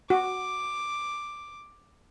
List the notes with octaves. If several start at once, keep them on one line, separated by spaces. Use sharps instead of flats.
F#4 D6